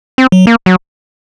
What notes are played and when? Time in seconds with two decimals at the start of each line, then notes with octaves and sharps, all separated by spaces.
0.18 C4
0.32 F#3
0.47 A#3
0.66 F#3